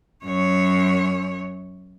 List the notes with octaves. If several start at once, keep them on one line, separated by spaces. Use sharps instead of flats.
F#2 C#5